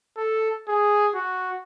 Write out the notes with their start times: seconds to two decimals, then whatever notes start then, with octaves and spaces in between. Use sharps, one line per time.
0.17 A4
0.68 G#4
1.14 F#4